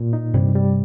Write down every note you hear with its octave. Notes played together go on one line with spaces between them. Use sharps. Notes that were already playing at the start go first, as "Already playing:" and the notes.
Already playing: A#2
D#4
G2 C3 G3
G3